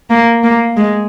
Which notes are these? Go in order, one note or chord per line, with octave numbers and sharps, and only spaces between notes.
A#3
A#3
G#3